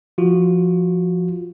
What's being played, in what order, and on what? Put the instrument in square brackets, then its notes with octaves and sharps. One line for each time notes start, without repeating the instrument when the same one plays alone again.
[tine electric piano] F3 F4 F#4